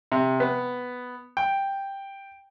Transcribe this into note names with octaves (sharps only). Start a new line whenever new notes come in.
C3
B3
G5